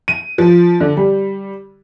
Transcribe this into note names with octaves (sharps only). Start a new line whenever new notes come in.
D#7
F3
D3
G3